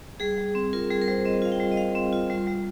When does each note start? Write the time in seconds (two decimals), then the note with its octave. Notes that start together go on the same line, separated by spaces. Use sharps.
0.20 G3 G#4
0.38 G3
0.55 C4
0.73 F4 A#4
0.91 G3 G#4
1.02 A#4
1.08 G3 C5
1.26 C4 D#5
1.42 F4 F5
1.52 G5
1.60 G3
1.72 D#5
1.77 G3 F5
1.95 C4
2.13 F4
2.30 G3
2.47 G3